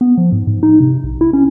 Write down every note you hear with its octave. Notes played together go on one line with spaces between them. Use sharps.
B3
F3
G#2
G#2
D#4
C3
A#1
E4
C#4